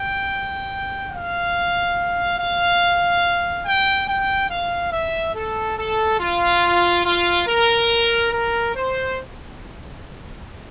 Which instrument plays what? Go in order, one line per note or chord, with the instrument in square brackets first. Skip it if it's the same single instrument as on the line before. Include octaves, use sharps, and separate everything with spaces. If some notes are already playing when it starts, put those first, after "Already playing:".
Already playing: [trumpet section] G5
F5
F5
G5
G5
F5
E5
A4
A4
F4
F4
A#4
A#4
C5